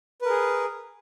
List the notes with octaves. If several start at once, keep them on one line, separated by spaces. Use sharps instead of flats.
G#4 A#4 B4